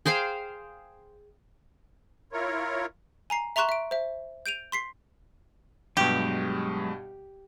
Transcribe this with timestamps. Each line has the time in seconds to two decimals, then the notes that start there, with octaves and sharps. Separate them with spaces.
0.06 G#4 C5 F5 G5
2.33 E4 F4 A#4 C#5
3.30 G#5 A#5 C7
3.56 E5 A#5 C6 C#6 F#6 E7
3.69 E5 D7
3.91 C5 E5
4.46 G6 D7 D#7 F7
4.72 C6 B6 C7
5.97 G2 B2 F#3 G#3 G4 C#6